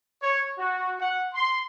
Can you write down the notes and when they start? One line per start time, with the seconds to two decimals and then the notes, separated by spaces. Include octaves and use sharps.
0.21 C#5
0.59 F#4
1.00 F#5
1.34 C6